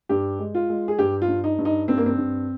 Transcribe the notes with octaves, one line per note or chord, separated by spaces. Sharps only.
G2 G4
G#3
F4
G#3
G#4
G2 G4
F4
G2
D#4
G2
D#4
G2 C4
A#3
C4
G2